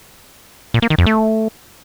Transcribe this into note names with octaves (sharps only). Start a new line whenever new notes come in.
A#2
A#3
D#3
F2
A3